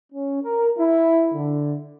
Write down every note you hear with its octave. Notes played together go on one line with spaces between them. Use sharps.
C#4
A#4
E4
D3